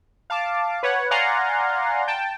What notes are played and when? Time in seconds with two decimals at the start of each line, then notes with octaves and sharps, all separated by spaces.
0.30 F5 A5 D6
0.83 B4 C#5 F#5
1.11 D5 F5 F#5 G#5 A#5 C6
2.08 G5 A5